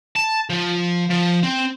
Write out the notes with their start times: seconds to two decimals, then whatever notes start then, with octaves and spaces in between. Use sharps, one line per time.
0.16 A5
0.50 F3
1.10 F3
1.43 C4